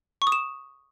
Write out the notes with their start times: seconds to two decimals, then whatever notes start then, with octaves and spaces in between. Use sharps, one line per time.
0.22 C#6
0.27 D#6
0.32 E7